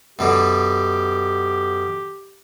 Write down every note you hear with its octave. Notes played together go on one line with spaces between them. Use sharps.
F#2 B2 D3 G4